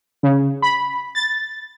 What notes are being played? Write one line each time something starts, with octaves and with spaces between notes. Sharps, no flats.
C#3
B5
A6